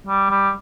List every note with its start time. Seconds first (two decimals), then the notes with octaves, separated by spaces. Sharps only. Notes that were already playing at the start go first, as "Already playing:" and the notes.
0.07 G3
0.30 G3